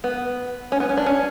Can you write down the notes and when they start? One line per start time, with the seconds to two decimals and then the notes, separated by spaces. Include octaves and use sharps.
0.04 B3
0.72 C#4
0.80 B3
0.89 C#4
0.97 D4
1.06 C#4